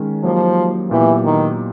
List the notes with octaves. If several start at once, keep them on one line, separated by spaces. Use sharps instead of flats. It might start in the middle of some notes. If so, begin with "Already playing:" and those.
Already playing: D#3 G#3 C#4
F3 F#3 A#3 D#4 G4
A#2 E3 F#3 B3 E4 G4
D#3